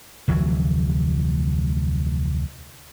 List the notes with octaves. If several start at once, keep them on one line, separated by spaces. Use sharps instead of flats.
F1 D2 E3 F#3